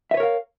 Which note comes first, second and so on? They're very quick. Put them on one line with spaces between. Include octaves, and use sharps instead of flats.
E5 B4 C#5 A#4 F5